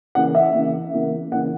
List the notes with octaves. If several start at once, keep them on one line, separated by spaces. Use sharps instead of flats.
C#3 E3 A#3 F#5
E5
C#3 E3 A#3
C#3 E3 A#3
C#3 E3 A#3 F#5